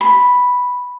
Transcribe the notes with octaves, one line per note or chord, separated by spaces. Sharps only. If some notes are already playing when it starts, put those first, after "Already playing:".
B5